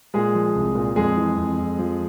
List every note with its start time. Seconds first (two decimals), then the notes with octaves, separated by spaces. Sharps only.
0.14 A#2 G#3 G#4
0.35 F3
0.55 C2
0.75 A#2
0.96 F2 G#3 G#4
1.17 E3
1.37 F2
1.58 F2
1.79 F3